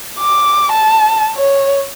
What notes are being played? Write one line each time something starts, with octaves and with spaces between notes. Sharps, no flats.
D6
A5
C#5